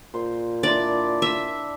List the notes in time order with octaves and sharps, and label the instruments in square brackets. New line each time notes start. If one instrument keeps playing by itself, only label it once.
[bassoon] A#2 [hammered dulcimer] C5
[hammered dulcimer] D4 E4 C6 [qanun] D5
[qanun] E5